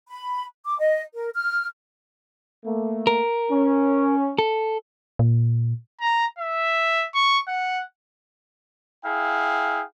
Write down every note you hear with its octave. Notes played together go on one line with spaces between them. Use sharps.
B5
D6
D#5
A#4
F6
A3 A#3
A#4
C#4
A4
A#2
A#5
E5
C#6
F#5
E4 G#4 F5 G5